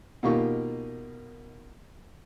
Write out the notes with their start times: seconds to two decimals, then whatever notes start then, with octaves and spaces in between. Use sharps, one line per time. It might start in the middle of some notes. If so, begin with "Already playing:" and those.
0.23 B2 D#3 A#3 F4 G4 C#6